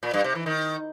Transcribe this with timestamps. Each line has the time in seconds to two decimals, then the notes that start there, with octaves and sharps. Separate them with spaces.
0.03 A#2
0.14 G2
0.24 C3
0.35 E3
0.46 D#3